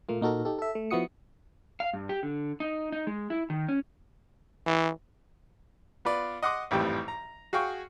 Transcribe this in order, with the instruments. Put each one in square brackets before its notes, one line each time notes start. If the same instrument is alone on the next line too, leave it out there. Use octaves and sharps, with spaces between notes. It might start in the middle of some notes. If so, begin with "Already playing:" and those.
[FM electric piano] A#2 A3 A#3 F4
A#2 D#4 F#4 A4 A#4
D#4 G4 A4
A4 E5
A3
F3 B3 E4 F#4 D#6 C#7
[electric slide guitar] F5
G2
G4
D3
D#4
D#4
G#3
E4
D#3
C#4
[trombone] E3
[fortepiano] B3 F4 B4 D5
D#5 F#5 C6 D6 D#6
G#1 F2 A2 E3 G3 G5
A#5
F#4 G#4 F5 G5 C#6